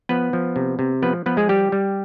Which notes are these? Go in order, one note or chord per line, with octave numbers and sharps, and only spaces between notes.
F3 B3 B4
F3
C3
C3
F3 B3 B4
F3 B3 B4
G#3 G#4
G3 G4
G3